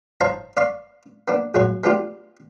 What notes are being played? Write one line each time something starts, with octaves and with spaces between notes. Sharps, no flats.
D#4 C5 C#5 F5 A5 A#5
D5 F5 B5 C#6
A#3 B3 D4
A#1 F#2 G#3 F#4 C#5
G#3 A3 B3 D4 F4 G4